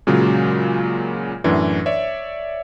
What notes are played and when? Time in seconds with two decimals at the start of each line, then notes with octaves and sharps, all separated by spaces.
0.07 A#2 C#3 F#3 G#3
1.44 F#2 A2 E3 D4 F#4
1.86 C#5 D5 E5